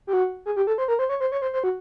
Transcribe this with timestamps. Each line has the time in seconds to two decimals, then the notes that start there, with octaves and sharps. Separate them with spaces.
0.07 G4
0.13 F#4
0.46 G#4
0.56 G4
0.67 A4
0.78 C5
0.88 A#4
0.99 C5
1.09 C#5
1.20 C5
1.32 C#5
1.42 C5
1.53 C5
1.64 F#4